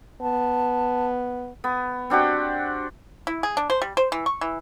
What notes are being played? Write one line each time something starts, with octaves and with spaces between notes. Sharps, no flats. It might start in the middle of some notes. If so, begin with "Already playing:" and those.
B3 A5
B3
C4 D4 F#4 G4
E4
G#4
D4
C5
G3
C5
E3
C#6
E3